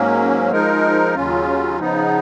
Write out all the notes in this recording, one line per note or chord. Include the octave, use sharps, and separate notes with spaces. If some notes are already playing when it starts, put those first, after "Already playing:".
Already playing: G#2 F#3 A#3 C#4
F3 G#3 D#4 A#4
D#2 C#3 F#3 C#4 F4
C#3 F3 B3 D#4